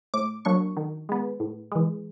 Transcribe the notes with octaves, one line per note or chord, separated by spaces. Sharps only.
A2 D6
F#3 A#3 D4 C#6
D#3
G#3 B3
A2
E3 G#3